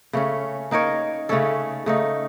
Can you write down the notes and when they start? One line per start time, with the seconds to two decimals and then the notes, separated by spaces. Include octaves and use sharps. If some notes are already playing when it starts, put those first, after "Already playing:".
0.13 C#3 A3 C#4
0.71 A#3 D#4 A#4 C#5
1.29 C#3 A3 C#4 A4
1.86 C#3 A3 D#4